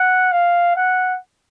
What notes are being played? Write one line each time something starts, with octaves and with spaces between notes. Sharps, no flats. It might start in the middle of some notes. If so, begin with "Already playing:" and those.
Already playing: F#5
F5
F#5